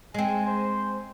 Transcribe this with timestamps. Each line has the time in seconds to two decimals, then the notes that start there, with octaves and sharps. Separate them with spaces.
0.14 G#3 C4 G#5
0.46 C5